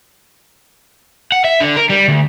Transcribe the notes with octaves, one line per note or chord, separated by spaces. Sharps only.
F#5
E5
D3
A#4
G3
D2